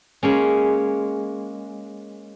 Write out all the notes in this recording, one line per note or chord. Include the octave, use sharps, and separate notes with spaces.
G#3 A#3 C#4